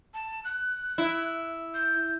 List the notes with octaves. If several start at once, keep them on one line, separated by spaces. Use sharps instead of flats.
A5
F#6
E4
G6